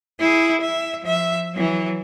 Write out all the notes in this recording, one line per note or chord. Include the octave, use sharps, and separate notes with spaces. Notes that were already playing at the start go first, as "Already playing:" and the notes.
E4 G#4
E5
F3 E5
E3 F#3